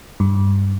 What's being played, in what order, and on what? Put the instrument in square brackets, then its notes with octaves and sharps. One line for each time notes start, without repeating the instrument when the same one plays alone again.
[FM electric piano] G2